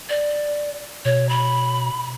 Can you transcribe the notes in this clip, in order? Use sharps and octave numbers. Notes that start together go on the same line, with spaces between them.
D5
B2 C#5
B5